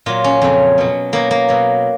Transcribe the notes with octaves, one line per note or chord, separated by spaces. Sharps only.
A#2 F#3 F4
C#4
F2 C#3 F#3
B2 F#3
B2 F#3 A#3
A#3
B2 F#3